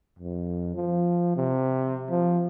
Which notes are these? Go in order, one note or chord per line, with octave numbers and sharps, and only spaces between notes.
F2
F3
C3
F3